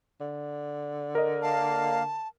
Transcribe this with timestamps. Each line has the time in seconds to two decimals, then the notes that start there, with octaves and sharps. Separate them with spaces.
0.20 D3
1.15 A#4 D#5
1.42 A#3 F5 A5